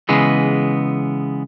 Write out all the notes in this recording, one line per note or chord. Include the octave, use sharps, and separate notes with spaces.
C#3 E3 G#3 B3